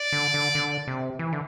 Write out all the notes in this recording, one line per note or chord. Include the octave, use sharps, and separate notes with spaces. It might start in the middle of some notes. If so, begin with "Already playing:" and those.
Already playing: D5
D3
D3
D3
C3
E3
D3